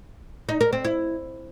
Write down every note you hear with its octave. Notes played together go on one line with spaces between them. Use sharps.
D#4
A#4
C4
E4